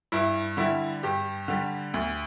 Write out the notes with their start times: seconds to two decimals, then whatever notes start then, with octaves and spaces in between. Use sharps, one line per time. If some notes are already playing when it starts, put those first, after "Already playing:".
0.12 G2 E4
0.57 D3 G3 E4
1.03 G2 G4
1.48 D3 G3
1.94 D2